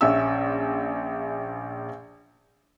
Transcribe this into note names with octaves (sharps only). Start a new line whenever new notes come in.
A#1 C#4 E5 E6